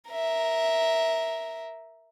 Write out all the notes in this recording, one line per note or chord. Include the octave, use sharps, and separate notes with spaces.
A#4 E5